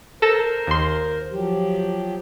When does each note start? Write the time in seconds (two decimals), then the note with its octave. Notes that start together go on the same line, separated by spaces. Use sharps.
0.22 A4 A#4 C5 A#6 E7
0.67 D#2 C6
1.32 F3 F#3 G4